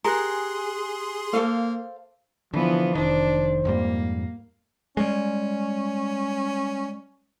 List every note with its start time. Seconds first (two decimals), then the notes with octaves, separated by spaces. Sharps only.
0.04 G4 G#4 A#4 G#5 C6 F#6
1.33 A#3 A4 C5 F5
2.54 D3 E3 F3 B3
2.95 F1 D#3 D4 C5
3.65 F2 G#2 G3 A#3
4.97 G3 G#3 C#4